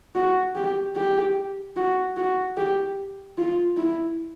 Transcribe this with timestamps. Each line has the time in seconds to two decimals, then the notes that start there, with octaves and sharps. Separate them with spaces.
0.15 F#4
0.55 G4
0.96 G4
1.76 F#4
2.16 F#4
2.57 G4
3.37 F4
3.77 E4